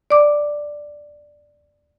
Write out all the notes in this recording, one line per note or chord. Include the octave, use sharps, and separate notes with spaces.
D5 D6